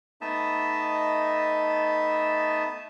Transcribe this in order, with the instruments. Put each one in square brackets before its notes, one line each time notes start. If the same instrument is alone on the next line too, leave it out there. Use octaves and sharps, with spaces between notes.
[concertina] A3 B3 D#4 D#5 E5 A5